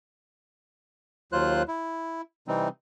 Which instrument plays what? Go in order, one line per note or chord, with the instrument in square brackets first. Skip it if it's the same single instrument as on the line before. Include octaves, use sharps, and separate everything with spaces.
[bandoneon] D#2 F#3 F4 C5 F#6
E4
C3 E3 G3 C4 D#4